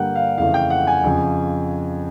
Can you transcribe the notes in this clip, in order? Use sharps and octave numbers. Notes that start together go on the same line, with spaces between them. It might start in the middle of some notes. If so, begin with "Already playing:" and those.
Already playing: G2 D3 G3 A#3 F#5 G5
F5
F2 C#3 E3 A3 F5
G5
F#5
G#5
F2 C#3 F3